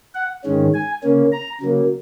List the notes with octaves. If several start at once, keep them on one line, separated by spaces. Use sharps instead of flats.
F#5
G#2 D#3 G#3 C#4
G#5
C#3 A#3 C#4
A#5
C#3 F#3 A#3